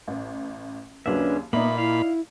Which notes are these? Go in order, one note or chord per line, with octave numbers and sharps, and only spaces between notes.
A1
D#2 C#3 F#3 C#4 D4 B4 E5
A#2 A#3 B3 D#4 D5 E5 B5 F#7
E4 F5